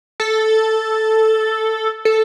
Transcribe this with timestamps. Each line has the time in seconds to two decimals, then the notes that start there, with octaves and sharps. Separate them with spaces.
0.20 A4
2.05 A4